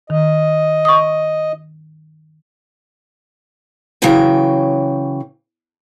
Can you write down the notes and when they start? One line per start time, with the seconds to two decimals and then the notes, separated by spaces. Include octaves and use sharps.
0.10 D#3 D#5
0.85 C#6 D#6
4.02 C#3 E3 F#3 F#4 G5 G#5